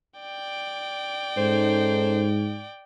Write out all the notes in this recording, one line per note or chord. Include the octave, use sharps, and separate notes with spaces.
D5 G5
G#2 C#4 D#4 A4 C5